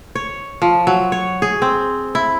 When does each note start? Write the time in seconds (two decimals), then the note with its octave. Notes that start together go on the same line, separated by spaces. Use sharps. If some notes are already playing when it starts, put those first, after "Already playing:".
0.15 C#5
0.62 F3
0.87 F#3
1.12 C#5
1.42 G#4
1.62 C4
2.15 E4